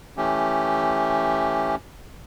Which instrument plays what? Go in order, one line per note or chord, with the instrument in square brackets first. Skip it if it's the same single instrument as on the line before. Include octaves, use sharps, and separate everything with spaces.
[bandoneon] E3 A3 C#4 G4